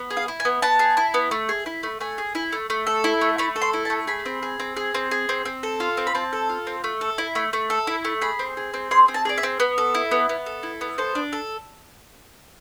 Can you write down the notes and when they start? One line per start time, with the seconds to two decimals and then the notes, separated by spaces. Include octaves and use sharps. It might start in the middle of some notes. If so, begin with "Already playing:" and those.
Already playing: B3
0.11 G#4
0.17 F5
0.28 E4
0.40 G#5
0.45 B3
0.62 B3 A5
0.79 G#4
0.97 E4
1.14 B3
1.31 A3
1.49 G#4
1.66 E4
1.83 A3
2.00 A3 G#5
2.18 G#4
2.35 E4
2.52 A3
2.70 A3
2.87 A4
3.04 E4
3.21 A3
3.38 A3 B5
3.56 A4
3.62 C6
3.73 E4
3.85 A5
3.90 A3
4.07 G#4 B5
4.26 C4
4.43 G#4
4.60 C4
4.77 G#4
4.94 C4
5.11 G#4
5.29 C4
5.45 C4
5.63 A4
5.80 F4
5.97 C4
6.07 B5
6.15 C4 A5
6.33 A4
6.50 F4
6.67 C4
6.84 A3
7.01 A4
7.18 E4
7.35 A3
7.53 A3
7.70 A4
7.87 E4
8.05 A3
8.22 G#4 B5
8.39 C4
8.57 G#4
8.74 C4
8.91 G#4 C6
9.08 C4
9.14 A5
9.25 G#4 D5
9.38 E5
9.43 C4
9.60 B3
9.78 A4
9.95 E4
10.11 B3
10.29 B3
10.46 A4
10.63 E4
10.81 B3
10.98 A4 C5
11.15 D4
11.32 A4